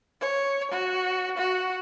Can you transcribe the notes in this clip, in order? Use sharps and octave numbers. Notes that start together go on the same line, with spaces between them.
C#5
F#4
F#4